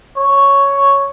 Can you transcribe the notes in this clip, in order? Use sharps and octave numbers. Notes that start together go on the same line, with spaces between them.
C#5